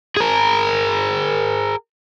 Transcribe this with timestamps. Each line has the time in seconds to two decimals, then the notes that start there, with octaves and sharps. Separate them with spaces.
0.17 G#4 A#4